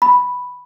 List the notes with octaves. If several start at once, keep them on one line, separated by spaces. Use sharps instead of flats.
B5